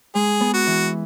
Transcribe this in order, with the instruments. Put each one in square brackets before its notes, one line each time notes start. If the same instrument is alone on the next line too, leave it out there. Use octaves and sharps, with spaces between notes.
[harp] G#3 [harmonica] G#4
[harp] B3
[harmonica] F#4
[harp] E3